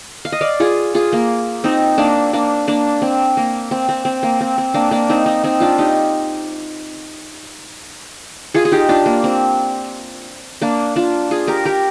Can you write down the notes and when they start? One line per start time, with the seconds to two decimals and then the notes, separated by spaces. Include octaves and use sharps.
0.25 F5
0.32 D#5
0.41 D5 F5
0.60 F4 G#4
0.95 F4 G#4
1.13 A#3
1.64 C4 D#4
1.98 A#3 D4
2.33 A#3 D4
2.68 A#3 D4
3.02 C4
3.37 A#3
3.71 C4
3.89 C4
4.05 C4
4.23 A#3
4.41 C4
4.58 C4
4.74 A#3 D4
4.91 A#3 D4
5.09 C4 D#4
5.26 C4 D#4
5.44 C4 D#4
5.60 D4 F4
5.78 D#4 G4
8.54 F4 G#4
8.65 G#4
8.72 D#4 G4
8.89 D4 F4
9.06 A#3
9.24 C4
10.61 A#3 D4
10.96 D4 F4
11.31 F4 G#4
11.47 G4 A#4
11.65 G4 A#4